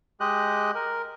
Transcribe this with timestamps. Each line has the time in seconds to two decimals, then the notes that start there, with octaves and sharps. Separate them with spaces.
0.20 G#3 G4 D#5 F#6
0.75 A#4